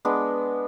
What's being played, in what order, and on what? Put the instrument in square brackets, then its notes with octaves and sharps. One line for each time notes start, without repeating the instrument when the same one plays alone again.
[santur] G#3 B3 D4